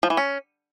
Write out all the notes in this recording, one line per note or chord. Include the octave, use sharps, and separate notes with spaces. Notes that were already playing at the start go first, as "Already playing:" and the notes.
F3
E3
C#4